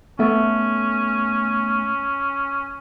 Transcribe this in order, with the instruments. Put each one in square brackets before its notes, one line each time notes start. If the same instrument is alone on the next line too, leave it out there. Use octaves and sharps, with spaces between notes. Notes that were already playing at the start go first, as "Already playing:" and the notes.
[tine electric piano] A3 B3 [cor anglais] C#4